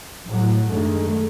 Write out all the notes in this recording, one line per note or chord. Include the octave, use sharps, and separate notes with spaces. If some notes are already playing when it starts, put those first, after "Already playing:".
A2 F#3
F#2 D3 D#3 G#3 A3